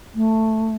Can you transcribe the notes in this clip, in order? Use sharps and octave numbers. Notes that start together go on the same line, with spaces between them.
A3